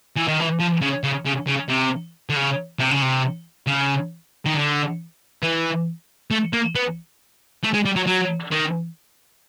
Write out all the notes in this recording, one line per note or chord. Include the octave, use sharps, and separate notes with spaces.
E3
D#3
E3
F3
C#3
C#3
C#3
C#3
C3
D3
C#3
C3
C#3
C3
C#3
D#3
D3
E3
A3
A#3
B3
A3
G#3
G3
F#3
F#3
D#3